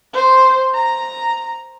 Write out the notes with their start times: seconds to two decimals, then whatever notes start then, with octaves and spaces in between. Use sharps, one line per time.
0.13 C5
0.74 A#5